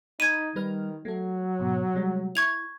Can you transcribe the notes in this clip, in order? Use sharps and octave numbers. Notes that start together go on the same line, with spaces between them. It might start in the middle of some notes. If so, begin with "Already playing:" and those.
D#4 B5 G#6 D#7
D#3 G3 B4 F6
F#3 A3 A4
G#2 B2
C3 G3 G#3
E4 C#6 G#6 F7